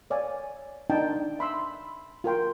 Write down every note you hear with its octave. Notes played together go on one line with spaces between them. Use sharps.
C#5 D5 F5 G#5
D4 D#4 G5 A5
E5 B5 C6 E6
F4 A#4 G5 C6